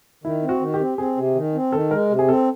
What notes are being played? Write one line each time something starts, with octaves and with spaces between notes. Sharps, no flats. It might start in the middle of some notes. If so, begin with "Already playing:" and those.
D#3 E4
C4
F#4
D#3
G4
C4
C4 G#4
C3
D#3
C4
D#3 A4
G#3 A#4
C3
G#4
C4 A4